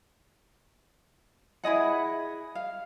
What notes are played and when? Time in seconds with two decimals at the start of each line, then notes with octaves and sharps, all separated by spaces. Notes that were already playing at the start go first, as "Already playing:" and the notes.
1.64 E4 G#4 D#5 F#5
2.55 F5